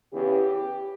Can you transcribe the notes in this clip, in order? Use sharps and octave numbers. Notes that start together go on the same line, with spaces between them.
E2 C#3 E3 G4